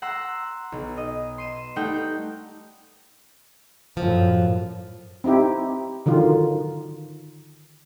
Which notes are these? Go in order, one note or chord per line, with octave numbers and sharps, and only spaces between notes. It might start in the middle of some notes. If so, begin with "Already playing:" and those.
F#5 A#5 C6 E6
B1
D#5
C6 D#7 E7
G3 A3 D#4 F#5 G5
F#2 A2 F3
C4 D#4 E4 G4
D3 D#3 F#3 F4